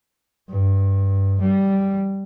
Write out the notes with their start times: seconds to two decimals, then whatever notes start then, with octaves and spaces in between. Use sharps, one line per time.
0.50 G2
1.41 G3